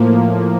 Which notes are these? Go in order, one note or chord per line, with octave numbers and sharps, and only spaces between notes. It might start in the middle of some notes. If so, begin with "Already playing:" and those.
Already playing: A2 F3 A#3